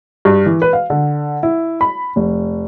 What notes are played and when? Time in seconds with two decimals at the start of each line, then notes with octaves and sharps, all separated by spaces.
0.25 G2
0.46 E3
0.62 B4
0.73 F5
0.90 D3
1.43 E4
1.81 B5
2.16 F1